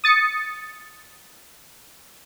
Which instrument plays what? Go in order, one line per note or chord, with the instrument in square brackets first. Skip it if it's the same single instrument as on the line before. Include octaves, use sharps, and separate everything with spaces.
[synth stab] D#6 A6 C#7